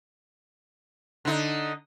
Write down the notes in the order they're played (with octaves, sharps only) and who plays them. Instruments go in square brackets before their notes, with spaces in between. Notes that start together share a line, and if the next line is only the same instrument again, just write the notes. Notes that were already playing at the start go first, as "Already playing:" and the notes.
[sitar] D3 D#4